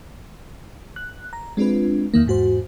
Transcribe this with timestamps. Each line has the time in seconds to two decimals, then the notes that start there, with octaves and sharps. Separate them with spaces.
0.96 F#6
1.33 A#5
1.57 G#3 C4 D4 F4 B4
2.14 E2 D#3 A#3
2.26 E2 G#2 F#4 C5